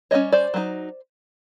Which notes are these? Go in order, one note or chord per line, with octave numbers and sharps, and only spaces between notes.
G3 A#3 C#4 C#5 D#5
C5 D5
F#3 B3 D#4